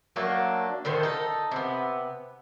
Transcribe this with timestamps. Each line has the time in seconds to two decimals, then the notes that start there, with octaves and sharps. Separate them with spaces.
0.16 F#3 A3 A#3 D4
0.85 A2 D3 D#3 C5
1.03 D#4 A4
1.52 C3 B3